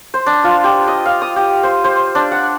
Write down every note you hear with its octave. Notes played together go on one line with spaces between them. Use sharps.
C5
D4
F4
G4
D#5
F5
D#6
G4
C5
C5
D4
F#5